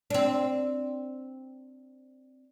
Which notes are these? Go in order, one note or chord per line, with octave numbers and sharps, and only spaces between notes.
C4 D4